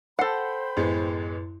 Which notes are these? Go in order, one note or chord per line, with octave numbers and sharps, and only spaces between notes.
A4 C5 F#5 G5 B5 C7
A1 F#2 G#3 B3 E4 C6